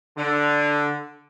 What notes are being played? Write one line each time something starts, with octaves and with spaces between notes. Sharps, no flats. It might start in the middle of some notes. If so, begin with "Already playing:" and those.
D3